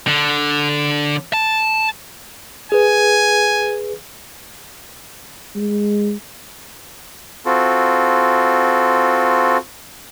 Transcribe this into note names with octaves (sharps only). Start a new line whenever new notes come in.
D3
A5
G#4 B4 G#5
G#3
C4 F4 F#4 A4